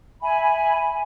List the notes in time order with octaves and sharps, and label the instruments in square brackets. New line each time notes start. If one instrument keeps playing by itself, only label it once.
[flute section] E5 G#5 B5